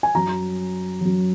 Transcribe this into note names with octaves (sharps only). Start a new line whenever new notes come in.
G#5
F#2 F#3 A#5
F#2 F#3